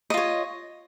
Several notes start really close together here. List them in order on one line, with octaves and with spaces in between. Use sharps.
D#5 F4 C#5